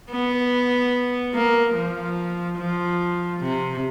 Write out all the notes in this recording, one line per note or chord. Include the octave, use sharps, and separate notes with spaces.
B3
A#3
F3
F3
C3